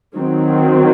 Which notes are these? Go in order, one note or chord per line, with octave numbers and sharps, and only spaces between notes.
D#3 F#3 C4